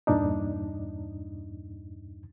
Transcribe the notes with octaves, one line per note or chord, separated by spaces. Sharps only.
E2 G2 A#2 D4 D#4